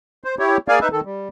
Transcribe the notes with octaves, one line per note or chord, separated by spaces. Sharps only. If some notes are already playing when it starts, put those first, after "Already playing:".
C5
E4 G4 C#5
A#3 G#4 D5 F5 G#5
D#4 B4 E5
D#3 A4
G3